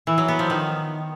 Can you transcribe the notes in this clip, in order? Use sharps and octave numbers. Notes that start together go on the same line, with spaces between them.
E3
F#3
B3
F3
D#3